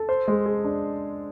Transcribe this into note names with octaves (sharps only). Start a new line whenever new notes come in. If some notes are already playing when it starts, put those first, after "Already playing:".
Already playing: A4
C5
G#3
G#4
D4